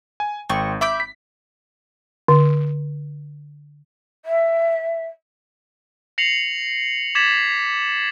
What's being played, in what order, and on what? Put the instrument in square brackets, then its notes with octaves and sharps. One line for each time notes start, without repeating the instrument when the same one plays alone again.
[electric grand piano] G#5
[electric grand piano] G#1 [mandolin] C4 C#6
[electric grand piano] E5 [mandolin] B5 D6 G6
[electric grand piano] B6
[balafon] D3
[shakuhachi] E5
[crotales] A#6 C7 C#7 F7 F#7
D6 G#6 A6 B6 E7 F#7